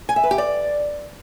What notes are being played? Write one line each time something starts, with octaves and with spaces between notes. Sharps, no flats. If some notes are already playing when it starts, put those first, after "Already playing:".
G#5
E5
B4
G4
D5